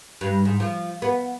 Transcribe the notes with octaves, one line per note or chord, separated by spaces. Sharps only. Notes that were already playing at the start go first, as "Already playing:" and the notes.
G2
G#2
F3
B3